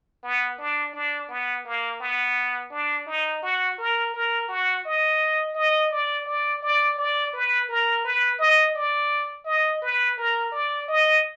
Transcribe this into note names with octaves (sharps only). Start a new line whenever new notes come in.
B3
D4
D4
B3
A#3
B3
D4
D#4
F#4
A#4
A#4
F#4
D#5
D#5
D5
D5
D5
D5
B4
A#4
B4
D#5
D5
D#5
B4
A#4
D5
D#5